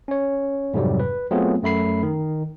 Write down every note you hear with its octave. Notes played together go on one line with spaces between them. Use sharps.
C#4 C#5
F2 G#2 C3 F#3 G3
B4
F#3 A3 B3 C4 F4 G#4
F#2 A3 B5 C7
D#3